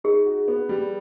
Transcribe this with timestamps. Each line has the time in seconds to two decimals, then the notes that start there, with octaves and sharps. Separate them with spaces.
0.04 D#4 G#4
0.26 F#4
0.48 B3
0.69 G3